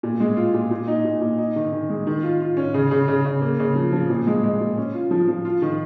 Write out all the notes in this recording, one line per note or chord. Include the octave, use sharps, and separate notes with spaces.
A#2
G#3
F4
A#2
A#2
D#4
A#2
A#2
D#4
D#3
D#3
G#3
D#3
F4
F4
C#4
C#3
C#3
C#3
C#3
A#3
C#3
F3
F3
A#2
G#3
G#3
A#2
C#4
F4
F3
F3
F4
D#3